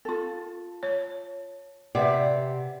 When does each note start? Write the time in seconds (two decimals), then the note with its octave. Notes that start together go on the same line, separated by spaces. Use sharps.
0.05 F4 A4
0.83 C#5
1.95 C3 G4 B4 D5 E5 F#5